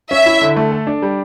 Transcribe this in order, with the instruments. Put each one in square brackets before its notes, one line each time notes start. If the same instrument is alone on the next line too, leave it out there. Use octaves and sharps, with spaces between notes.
[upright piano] C#4 [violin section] E5
[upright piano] E4
D3
A3
A4
D4
G3